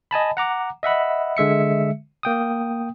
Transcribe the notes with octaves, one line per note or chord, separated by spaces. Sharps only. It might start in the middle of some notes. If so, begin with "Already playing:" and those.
D#5 G#5 A5 B5
F#5 A#5 D6
D#5 E5 F#5 B5
D3 G#3 E5 C#7
A#3 G5 D#6